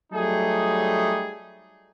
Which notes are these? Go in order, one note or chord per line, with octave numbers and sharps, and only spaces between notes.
F#3 G3 A3 D#4 G#4